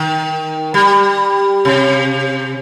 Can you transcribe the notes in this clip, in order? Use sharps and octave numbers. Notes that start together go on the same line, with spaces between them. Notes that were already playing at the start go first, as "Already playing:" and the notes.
Already playing: D#3
G3
C3